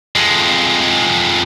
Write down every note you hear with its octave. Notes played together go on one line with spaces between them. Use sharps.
F2 G#3